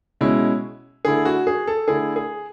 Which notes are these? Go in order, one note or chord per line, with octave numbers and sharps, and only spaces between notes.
B2 G#3 C#4 E4
D3 A3 E4 G#4
F#4
G#4
A4
D3 A3 E4 G#4
G#4